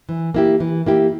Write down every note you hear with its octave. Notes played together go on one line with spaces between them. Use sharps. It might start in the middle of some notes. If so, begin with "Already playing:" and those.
E3
A#3 E4 G4
E3
A#3 E4 G4